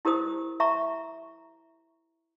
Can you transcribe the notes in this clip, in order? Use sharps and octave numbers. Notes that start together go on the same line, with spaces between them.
E4 G4 A#4 C5 D#6
E5 A#5 C#6